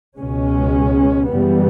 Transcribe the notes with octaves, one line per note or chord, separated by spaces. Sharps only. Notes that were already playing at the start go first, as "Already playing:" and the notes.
C#2 B2 G#3 C#4
F#2 C#3 E3 G3 B3